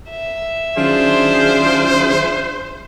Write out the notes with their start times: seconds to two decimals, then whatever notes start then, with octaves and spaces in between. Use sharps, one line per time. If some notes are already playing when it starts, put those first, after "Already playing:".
0.11 E5
0.77 D#3 F#3 C#4 D4 F4 G#4 C5